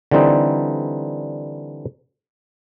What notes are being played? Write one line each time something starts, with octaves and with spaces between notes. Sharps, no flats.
D3 E3 G3 C4 D#4